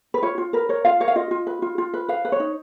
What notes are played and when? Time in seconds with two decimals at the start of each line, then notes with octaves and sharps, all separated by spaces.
0.14 B4
0.23 F4 C#5
0.38 F4
0.53 A#4 B4
0.69 A#4 C#5
0.85 F4 F5
1.00 A#4 C#5
1.08 F5
1.16 F4 D#5
1.31 F4
1.47 B4
1.62 F4
1.78 F4
1.94 B4
2.08 B4 F5
2.25 B4
2.32 C#5
2.40 D#4